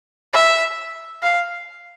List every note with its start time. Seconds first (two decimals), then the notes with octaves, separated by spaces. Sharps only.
0.33 E5
1.23 F5